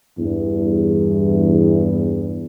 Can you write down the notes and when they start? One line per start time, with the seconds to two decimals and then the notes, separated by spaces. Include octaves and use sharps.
0.18 E2 G2